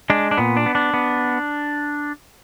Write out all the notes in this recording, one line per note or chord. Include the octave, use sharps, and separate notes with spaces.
G#3 D4
D4
A#2 B3
D4
B3
D4
B3